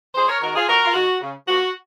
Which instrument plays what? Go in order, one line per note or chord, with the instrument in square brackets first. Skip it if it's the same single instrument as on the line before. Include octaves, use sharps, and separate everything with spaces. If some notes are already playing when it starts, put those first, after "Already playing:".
[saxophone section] F2 G#4 C5
A#4 C#5
D#3 G#3 F#4 A#4
F4 G#4
F2 F#4 A#4
F4
D#3 G#3 F#4
C#3
F3 A#3 F#4